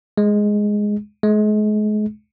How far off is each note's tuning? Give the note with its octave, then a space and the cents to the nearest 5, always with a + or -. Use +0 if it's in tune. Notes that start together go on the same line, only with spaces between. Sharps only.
G#3 +0
G#3 +35